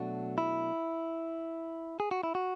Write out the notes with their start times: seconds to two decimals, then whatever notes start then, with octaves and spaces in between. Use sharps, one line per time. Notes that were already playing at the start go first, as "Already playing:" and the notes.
Already playing: B2 F#3 A3 D4 F#4
0.38 E4
2.00 G#4
2.11 F#4
2.23 E4
2.35 F#4